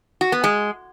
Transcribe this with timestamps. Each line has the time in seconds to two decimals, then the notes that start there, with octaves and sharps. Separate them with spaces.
0.21 F#4
0.32 B3
0.44 G#3